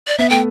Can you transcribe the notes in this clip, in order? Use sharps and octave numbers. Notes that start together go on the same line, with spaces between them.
D5
B3 E5
A3 G5